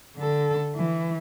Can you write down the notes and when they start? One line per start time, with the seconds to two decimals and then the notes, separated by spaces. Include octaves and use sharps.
0.17 D3 A4
0.75 E3